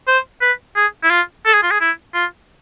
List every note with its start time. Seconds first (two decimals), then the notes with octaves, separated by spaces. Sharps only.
0.08 C5
0.41 B4
0.76 G#4
1.04 E4
1.11 F4
1.46 A4
1.54 G#4
1.63 F4
1.71 G#4
1.81 E4
2.14 F4